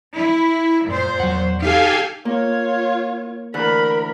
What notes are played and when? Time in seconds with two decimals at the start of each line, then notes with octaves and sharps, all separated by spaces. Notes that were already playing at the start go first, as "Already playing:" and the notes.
0.15 E4
0.88 F#2 A#2 C5
1.20 E2 F#3 F#5
1.62 D#4 G4 A4 F5 G#5
2.25 A#3 F4 C#5
3.54 D2 E3 A#4 B5 F#6